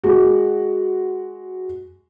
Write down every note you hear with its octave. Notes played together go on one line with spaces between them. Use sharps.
G#3 F#4